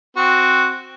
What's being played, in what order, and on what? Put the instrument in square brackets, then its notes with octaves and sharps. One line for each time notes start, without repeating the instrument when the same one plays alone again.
[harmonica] C4 F#4